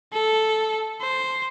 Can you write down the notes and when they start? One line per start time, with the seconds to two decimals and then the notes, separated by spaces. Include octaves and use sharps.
0.13 A4
1.02 C5